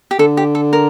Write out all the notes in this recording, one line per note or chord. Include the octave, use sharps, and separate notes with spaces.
G4
D3 A4
G4
A4
A#4